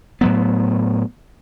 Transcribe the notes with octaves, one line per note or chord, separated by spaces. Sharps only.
A2 F#3 B3